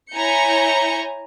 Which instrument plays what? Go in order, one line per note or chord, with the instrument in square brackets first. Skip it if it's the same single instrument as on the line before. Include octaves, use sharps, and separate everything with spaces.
[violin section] E4 C#5 G#5 A#5 G6 C#7